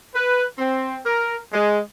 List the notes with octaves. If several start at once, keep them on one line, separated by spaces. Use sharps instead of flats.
B4
C4
A#4
G#3